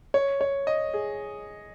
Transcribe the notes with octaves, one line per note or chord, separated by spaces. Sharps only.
C#5
C#5
D#5
G#4